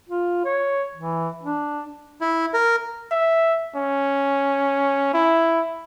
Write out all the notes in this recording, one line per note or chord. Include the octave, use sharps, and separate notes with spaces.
F4
C#5
E3
D4
E4
A#4
E5
C#4
E4